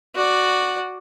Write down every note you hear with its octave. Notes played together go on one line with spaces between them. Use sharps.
F#4 D5